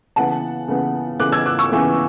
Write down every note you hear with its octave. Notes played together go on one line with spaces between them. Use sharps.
C#3 E3 B3 F#5 A5
C#3 E3 B3
C#3 E3 B3 D6 F#6
E6 G#6
D6 F#6
C#6 E6
C#3 E3 B3